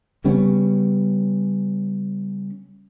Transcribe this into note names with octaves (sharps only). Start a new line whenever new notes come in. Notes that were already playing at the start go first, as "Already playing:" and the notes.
C#3 G3 B3 C#4